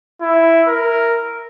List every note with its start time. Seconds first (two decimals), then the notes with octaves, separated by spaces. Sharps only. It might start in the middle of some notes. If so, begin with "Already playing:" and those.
0.22 E4
0.68 A#4